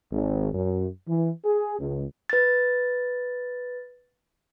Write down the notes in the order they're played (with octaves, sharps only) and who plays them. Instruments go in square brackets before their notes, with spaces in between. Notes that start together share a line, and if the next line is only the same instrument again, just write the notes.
[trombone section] G#1
F#2
E3
G#4
C#2
[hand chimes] B4 A6